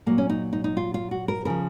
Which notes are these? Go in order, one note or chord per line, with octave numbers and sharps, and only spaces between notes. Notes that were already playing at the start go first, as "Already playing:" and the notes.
A#2 F#3 A#3
C#4
D#4
D#4
D#4
F4
F4
F#4
A#4
C#3 F3 A#4